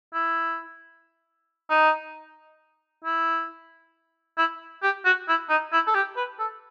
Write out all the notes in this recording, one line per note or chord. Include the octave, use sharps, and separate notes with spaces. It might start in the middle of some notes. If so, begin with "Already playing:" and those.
E4
D#4
E4
E4
G4
F#4
E4
D#4
E4
A4
G4
B4
A4